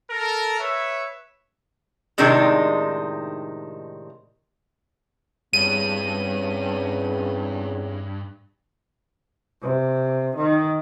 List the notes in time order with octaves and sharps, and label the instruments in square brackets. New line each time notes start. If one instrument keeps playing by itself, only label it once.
[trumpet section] A4 A#4
B4 C#5 E5
[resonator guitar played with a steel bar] A2 C3 D#3 G#3 D4 D#4
[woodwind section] E2 C#3 C4 [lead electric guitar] G2 [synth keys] D#7
[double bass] C3
D#3